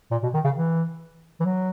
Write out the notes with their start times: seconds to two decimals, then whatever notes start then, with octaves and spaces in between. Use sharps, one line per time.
0.11 A#2
0.23 B2
0.34 D#3
0.44 C#3
0.56 E3
1.40 E3
1.45 F#3